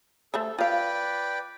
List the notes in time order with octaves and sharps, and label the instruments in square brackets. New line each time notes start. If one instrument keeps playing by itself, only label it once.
[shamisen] A3 C5 E5 [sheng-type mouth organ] A4
[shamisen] F4 F5 [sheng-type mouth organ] B4 D5 G5